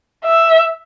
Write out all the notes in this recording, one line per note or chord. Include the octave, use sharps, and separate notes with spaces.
E5